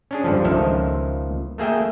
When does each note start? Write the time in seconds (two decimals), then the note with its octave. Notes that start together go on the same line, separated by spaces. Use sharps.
0.11 C#4 D4 G#4
0.24 G2 D3 F3
0.44 C#2 D#3 F3 A4 E5 F5
1.58 A3 A#3 G#4 E5 G5